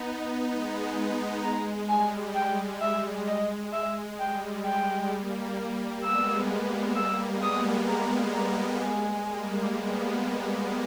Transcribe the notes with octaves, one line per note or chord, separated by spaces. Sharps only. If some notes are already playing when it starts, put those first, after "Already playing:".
Already playing: B3 D#4
G#3 B3
G#3 A#5
G3 G#5
G#3 G5
G#3 E5
D#5
E5
G3 G5
G#3 G5
G3 A#3
G#3 B3 E6
G#3
G3 A#3 E6
G#3 B3
D#6
G3 A#3
G#3 A#5
A#5
G#3 G#5
G3 A#3
G#3 B3